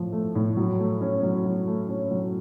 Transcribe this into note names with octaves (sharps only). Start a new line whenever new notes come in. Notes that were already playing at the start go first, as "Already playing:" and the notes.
Already playing: A2 F3
A3
A2
F#3
A3
C#4
F#3
F#3
A3
C#4
F#3